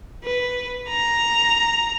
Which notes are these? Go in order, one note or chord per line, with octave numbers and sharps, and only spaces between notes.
B4
A#5